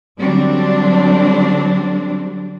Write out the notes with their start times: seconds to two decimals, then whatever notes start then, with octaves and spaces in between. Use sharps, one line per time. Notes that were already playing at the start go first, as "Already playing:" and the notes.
0.18 D3 F#3 G3 C4 D4